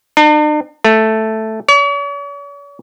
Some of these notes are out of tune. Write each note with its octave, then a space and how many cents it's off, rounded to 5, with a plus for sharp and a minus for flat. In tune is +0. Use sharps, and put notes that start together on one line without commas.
D4 +45
A3 +0
C#5 +45